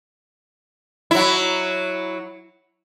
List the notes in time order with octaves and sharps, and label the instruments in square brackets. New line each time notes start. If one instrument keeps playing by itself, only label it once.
[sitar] F#3 E4